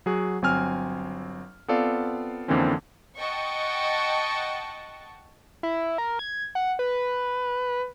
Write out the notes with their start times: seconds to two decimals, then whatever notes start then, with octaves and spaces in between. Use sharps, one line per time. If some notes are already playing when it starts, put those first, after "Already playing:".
0.06 F#3 F#4 G#4
0.42 G1 F#3 C4 G#5 F6
1.68 B3 C4 F4 A4 D5 F5
2.48 F2 D3 E3 A#3 C4 C#4
3.17 D#5 F#5 G5 A5 C#6
5.63 E4
5.98 A#4
6.19 G#6
6.55 F#5
6.79 B4